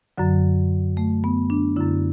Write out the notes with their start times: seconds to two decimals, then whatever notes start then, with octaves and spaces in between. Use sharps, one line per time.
0.18 F#2 D3 F#3
0.97 A3
1.24 B3
1.50 D4
1.77 F#2 D3 E4